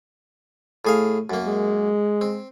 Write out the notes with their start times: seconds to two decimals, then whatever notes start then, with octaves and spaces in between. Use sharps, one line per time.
0.85 A2 G#4 F5
1.30 F#2 A#3
1.46 G#3
2.21 C4